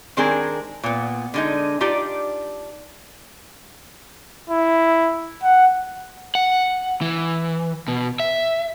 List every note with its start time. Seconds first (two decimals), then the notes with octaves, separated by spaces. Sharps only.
0.17 D#3 G#3 C4 D4 G#4 A#4
0.83 A#2 B3
1.34 D3 G#3 D#4
1.81 D4 D#4 F4 G4 D5
4.50 E4
5.43 F#5
6.35 F#5
7.01 E3
7.88 B2
8.20 E5